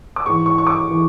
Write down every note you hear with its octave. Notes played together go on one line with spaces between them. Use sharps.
D6
G#2 E3 C#6
C#6
C#6
D6
E3